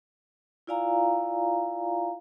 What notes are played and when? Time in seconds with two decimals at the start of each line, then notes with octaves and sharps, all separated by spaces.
0.67 E4 F4 D5 F5 G#5 A#5